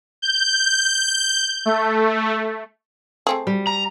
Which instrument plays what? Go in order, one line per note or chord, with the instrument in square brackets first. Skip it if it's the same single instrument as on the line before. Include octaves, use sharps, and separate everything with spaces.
[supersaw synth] G6
A3
[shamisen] A3 C4 G#4
[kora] G3
[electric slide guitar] A#5